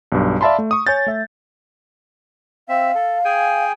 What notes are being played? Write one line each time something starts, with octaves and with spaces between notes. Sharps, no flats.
B1 G2
D5 E5 F5 A5 B5 C6
A3
C#6 D#6
C#5 G#5 G6 A6
A3 E5
C4 E5 F5
A4
G#4 G5 G#5